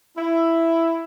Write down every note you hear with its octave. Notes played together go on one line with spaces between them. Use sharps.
E4